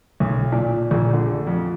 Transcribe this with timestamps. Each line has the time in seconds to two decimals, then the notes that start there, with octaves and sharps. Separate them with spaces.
0.20 B1
0.52 A#2
0.91 A#1
1.13 D3
1.47 F2